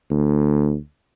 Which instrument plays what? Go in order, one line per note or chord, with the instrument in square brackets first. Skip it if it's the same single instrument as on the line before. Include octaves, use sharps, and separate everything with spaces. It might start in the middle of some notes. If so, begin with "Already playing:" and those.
[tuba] D2